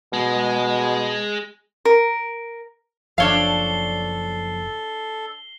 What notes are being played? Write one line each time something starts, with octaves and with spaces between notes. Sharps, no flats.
B2 G#3
A#4
F#1 F3 D4 A4 C#5 F5 C7 G7